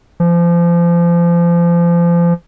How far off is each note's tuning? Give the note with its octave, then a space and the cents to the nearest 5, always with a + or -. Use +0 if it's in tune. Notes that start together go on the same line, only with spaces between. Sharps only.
F3 -30